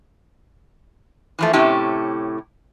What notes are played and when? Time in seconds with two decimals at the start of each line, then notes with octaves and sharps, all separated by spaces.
1.39 E3 F3 A3
1.53 A2 C3 C#4 E4 G4